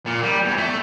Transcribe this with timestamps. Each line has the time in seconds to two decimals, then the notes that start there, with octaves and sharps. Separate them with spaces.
0.06 A#2
0.23 G3
0.45 E2
0.57 A3